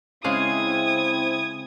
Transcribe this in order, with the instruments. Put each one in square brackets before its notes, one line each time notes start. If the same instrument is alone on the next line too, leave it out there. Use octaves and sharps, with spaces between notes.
[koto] C#3 G#3 F5 [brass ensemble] C4 E4 [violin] D#6 G#6